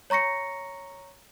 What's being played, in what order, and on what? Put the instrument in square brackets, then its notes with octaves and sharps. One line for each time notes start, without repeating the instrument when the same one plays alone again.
[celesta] C#5 A#5 C#6 A#6 C#7